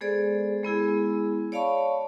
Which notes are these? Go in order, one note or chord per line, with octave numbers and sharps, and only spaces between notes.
G#3 B3 G#4 A4 C5 D5
G#3 B3 E4 G#4
C#5 D5 F5 A5 B5 C#6